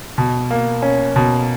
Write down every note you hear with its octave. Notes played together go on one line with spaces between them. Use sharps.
B2
A#3
C#4
B2